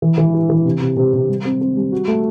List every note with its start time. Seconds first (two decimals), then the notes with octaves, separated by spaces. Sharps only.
0.02 E3
0.18 E3
0.34 E4
0.50 E3
0.65 C3
0.81 C3
0.97 C3
1.13 C3
1.29 G3
1.45 C4
1.61 C4
1.77 G3
1.92 F#4
2.08 A3